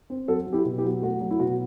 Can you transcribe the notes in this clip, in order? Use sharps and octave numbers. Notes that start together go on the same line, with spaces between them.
C4
F#3 F#4 A4
F#3
E4 G4
B2
E4 G4
F#3
A3 F#4
F#3
E4
B2 F#4